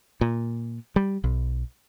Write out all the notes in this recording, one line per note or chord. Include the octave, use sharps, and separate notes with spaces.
A#2
G3
B1